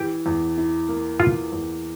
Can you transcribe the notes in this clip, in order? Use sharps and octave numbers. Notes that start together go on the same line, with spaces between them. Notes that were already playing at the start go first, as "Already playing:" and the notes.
Already playing: E3 G4
E2
E4
A#3
E3 F4
E2